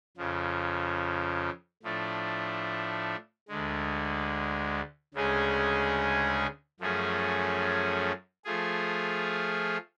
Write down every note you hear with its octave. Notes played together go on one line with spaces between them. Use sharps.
F2 C#3 F3
A2 F3 A3 D4
D2 D3 G#3
D2 C#3 G#3 C#4 G#4
F#2 F3 A3 C#4 G#4
F3 A3 F4 G#4